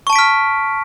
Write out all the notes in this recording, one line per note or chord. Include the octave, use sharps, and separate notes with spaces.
A5 C#6 F6 B6 D7